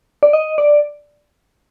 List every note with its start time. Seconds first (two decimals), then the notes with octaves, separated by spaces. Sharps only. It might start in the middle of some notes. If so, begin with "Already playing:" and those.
0.23 D5
0.33 D#5
0.58 D5